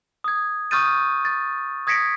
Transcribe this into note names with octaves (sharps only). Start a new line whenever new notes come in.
D#6 G#6
C#6 D#6 F6 G6 A6 D#7
A6
D#6 G#6 A#6 B6 C#7 D7